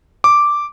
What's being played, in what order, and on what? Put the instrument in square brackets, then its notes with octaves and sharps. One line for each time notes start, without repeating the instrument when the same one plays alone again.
[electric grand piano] D6